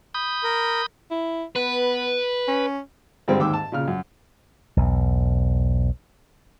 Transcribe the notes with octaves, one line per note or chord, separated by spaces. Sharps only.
B5 D#6 G6
A#4
E4
B3 B4
C#4
G2 D3 G3 G#3 C4
D#2 G#2 G5 D6 E6
A5
A#2 C#3 F6
F#2
B1 E2